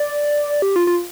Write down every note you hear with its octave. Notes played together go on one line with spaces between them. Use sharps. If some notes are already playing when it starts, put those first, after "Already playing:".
Already playing: D5
G4
F4
F4